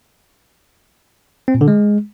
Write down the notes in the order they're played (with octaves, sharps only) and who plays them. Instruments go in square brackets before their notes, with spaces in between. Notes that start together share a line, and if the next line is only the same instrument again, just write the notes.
[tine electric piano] C4
A#2
D3
G#3